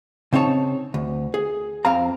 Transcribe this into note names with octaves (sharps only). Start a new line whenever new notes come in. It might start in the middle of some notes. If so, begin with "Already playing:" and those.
C#3 C4 D#4 C#5 A5
D2
G#4
F2 C4 F5 A#5